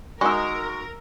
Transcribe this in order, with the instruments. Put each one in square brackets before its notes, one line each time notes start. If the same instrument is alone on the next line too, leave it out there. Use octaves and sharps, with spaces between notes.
[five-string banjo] G#3 [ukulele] D#4 F#4 [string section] A#4 [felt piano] C#6 E6